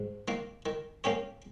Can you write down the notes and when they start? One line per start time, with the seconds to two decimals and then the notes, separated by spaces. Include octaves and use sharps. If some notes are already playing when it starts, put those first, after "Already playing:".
Already playing: G#2
0.28 D#3 A#3
0.66 D#3
1.04 A#3 C#4 G4 C#5